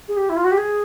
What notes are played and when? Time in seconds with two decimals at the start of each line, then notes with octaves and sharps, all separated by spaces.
0.08 G#4
0.17 G4
0.29 E4
0.37 F4
0.44 F#4
0.51 G4
0.58 G#4